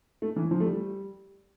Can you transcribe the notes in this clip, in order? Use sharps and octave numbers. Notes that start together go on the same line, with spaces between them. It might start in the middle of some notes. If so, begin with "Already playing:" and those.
A3
E3
F3
A3
G3